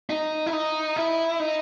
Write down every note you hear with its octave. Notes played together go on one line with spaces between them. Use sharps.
D#4
E4
D#4
E4
D#4